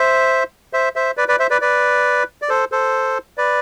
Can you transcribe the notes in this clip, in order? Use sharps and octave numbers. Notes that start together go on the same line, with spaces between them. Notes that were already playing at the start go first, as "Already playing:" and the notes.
Already playing: C5 E5
C5 E5
C5 E5
B4 D5
B4 D5
C5 E5
B4 D5
B4 D5
D5
A4 C5
A4 C5
B4 D5